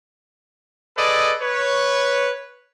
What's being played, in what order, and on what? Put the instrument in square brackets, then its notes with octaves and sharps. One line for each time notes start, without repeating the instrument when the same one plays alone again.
[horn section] G#4 A4 B4 D5 D#5
B4 C#5